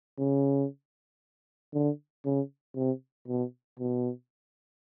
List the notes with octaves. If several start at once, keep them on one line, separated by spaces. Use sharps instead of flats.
C#3
D3
C#3
C3
B2
B2